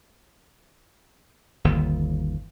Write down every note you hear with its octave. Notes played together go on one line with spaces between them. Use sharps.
G1 D#2